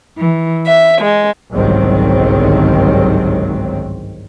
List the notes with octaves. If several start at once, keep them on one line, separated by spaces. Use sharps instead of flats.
E3
E5
G#3
G1 C2 G#2 D#3 F#3 C4